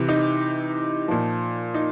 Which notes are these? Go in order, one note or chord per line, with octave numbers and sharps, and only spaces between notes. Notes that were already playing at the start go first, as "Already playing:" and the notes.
Already playing: C3 E3
D#4
A#2 F3
D#4